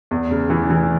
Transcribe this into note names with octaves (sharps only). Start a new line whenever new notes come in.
E2
C#3
E3
E3